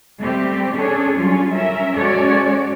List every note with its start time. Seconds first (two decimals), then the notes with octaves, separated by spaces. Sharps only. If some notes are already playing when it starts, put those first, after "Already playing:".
0.19 G3 A3 C4 G4
0.75 C#4 D4 G#4 A4 C#5
1.17 F#3 G3 C#4 D4 F4
1.55 C#4 A#4 E5
1.96 G#3 C#4 F#4 A4 C#5 D5